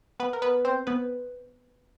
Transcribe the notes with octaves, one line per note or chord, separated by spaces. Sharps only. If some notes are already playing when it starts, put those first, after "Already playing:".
B3 B4
A#4
B3 B4
C4 C5
B3 B4